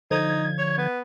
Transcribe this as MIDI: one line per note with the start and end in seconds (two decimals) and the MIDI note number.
0.11 0.88 50
0.11 0.88 53
0.11 0.46 63
0.11 0.88 92
0.58 0.75 73
0.78 1.00 59